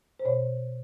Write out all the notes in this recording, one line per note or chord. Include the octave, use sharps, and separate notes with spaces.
C5
B2 C#5